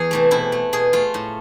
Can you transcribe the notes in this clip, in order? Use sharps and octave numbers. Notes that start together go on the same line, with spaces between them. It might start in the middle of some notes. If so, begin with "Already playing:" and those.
Already playing: E2 G#4
C3 E3 A3
B2 E4
A3
B2 G#4
A3 F4
A2